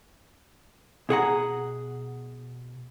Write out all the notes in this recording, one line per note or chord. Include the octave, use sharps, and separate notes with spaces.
B2 G#4 F#5 A#5